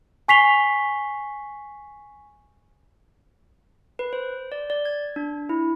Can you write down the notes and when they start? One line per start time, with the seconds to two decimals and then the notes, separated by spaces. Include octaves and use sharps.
0.28 G#5 C#6 B6 C7 F7 G7
3.99 B4
4.13 C5
4.52 D5
4.70 D5
4.85 G#6
5.16 D4
5.49 E4